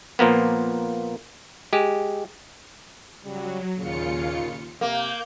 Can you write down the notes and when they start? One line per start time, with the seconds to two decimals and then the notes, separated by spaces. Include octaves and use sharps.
0.19 A#2 F3 A#3 B3
1.73 G#3 G4
3.25 C#3 F#3 G3
3.77 D#2 A#2 C#3 F4 C#7
4.81 C3 A#3 G6